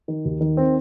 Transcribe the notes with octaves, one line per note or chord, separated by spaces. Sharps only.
D#3
D#2
D#3
C4